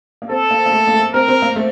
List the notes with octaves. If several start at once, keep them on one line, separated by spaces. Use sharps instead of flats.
A#3
C4 A4
A#3
A#3
A3
A#3
A3
C4 A#4
C4
A#3
A3